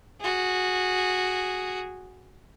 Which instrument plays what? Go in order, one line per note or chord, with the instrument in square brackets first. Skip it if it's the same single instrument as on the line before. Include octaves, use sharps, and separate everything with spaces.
[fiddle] F#4 G#4